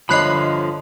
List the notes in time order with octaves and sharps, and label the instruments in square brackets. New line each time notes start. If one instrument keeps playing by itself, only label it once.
[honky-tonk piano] G1 C#5 D#5 [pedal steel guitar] D3 F3 [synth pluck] B5 F#6 C7